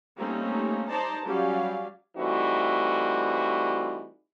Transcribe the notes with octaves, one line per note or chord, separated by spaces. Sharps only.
G3 A3 A#3 C4 C#4 D#4
D#4 C5 D5 A5 A#5
F#3 G3 C#4 G4 D5 F5
E3 G3 A3 C4 D#4 F#4